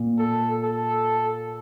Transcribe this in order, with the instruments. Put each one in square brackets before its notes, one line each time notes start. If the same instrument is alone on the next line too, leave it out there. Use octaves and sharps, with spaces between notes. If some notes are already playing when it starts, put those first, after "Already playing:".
Already playing: [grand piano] A#2
[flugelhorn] A4
A4